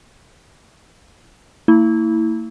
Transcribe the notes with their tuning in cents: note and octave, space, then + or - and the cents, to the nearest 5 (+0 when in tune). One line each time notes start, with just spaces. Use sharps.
A#3 -45 E4 -20